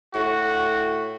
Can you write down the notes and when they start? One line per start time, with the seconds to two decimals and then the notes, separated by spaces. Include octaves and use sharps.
0.15 A2 F#4